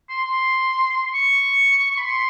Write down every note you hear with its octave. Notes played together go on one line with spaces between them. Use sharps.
C6
C6
C#6
B5
C6